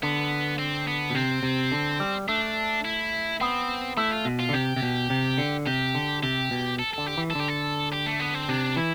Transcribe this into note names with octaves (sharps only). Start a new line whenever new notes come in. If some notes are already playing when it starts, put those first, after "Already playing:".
D3 B3
C4
B3
B2
C3 C4
C3
D3
G3
A3 D4
E4
B3 C4
A3 E4
F4
B2
F4
D3
C3 G4
C3
B2
C3
D3
C3 G4
D3
C3 G4
B2
A4
D3 A4
G4
E3
A4
D3 G4
A4
G4
A3
B3
C4
C3 D4
E3 E4